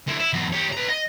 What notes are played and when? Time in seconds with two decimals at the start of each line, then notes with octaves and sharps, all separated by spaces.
0.07 D3 E4
0.19 E4
0.33 E2 F#3
0.53 G4 C#5
0.73 B4 A#5
0.88 D#5